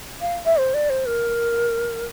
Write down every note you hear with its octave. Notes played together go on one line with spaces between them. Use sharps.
F5
E5
C5
D5
C5
A#4